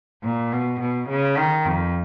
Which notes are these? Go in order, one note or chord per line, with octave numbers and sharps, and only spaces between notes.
A#2
B2
B2
C#3
D#3
F2